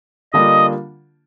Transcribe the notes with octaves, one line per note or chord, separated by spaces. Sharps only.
D3 G3 A#3 D4 F4 D#5